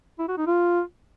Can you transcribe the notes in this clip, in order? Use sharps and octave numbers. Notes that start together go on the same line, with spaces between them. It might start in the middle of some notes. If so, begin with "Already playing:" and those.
E4
F#4
D#4
F4